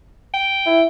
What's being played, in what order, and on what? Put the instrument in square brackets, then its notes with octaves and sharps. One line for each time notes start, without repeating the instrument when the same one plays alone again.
[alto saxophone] G5
[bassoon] E4